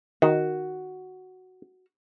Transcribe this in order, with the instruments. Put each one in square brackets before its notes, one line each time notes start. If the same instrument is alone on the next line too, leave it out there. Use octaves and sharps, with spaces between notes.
[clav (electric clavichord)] D#3 [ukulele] F#4